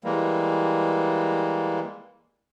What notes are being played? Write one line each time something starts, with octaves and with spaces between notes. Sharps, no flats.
E3 G3 G#3 A#3